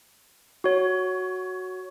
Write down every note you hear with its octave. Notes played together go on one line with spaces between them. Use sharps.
F#4 C#5